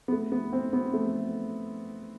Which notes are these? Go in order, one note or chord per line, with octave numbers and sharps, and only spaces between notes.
B3
A3
B3
C4
B3
A3